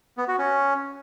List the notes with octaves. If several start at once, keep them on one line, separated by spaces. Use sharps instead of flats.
B3
F#4
C#4